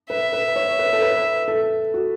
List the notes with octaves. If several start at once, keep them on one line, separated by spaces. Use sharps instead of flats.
B4 E5
B4
C#5
B4
A4
B4
A4
F#4